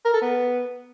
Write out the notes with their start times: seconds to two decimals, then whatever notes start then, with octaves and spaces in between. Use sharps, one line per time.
0.05 A#4
0.14 A4
0.22 B3